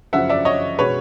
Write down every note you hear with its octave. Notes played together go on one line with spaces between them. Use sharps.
F#2 C#3 F3 E5 F#5
D5 E5
C#5 D#5
B2 G#3 B4 C#5